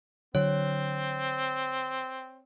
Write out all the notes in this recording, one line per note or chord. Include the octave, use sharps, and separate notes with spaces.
D3 F#3 C4 C#5